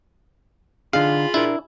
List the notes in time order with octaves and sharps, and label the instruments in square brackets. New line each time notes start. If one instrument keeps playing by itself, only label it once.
[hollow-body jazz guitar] D3 D4 D#4 [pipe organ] F4 B5 [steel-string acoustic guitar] G#4 [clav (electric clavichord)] F5
[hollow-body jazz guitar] D4 A#4 [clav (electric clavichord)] E4